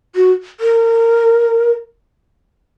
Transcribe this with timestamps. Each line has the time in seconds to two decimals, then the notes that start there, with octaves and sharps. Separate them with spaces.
0.16 F#4
0.60 A#4